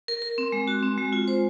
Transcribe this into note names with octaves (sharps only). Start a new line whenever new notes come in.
A#4
A#4
C4
G#3
F#4
C4
G#3
F4
C5